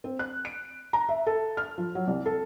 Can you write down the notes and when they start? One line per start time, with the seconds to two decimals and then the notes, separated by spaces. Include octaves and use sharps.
0.04 C4
0.19 F#6
0.45 D7
0.93 A#5
1.09 E5
1.26 A4
1.57 F6
1.78 F3
1.95 F#3
2.07 C2
2.26 A4